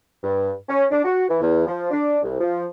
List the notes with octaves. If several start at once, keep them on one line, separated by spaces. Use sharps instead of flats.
G2
C#4
D4
F#4
E3
E2
F3
D4
C2
F3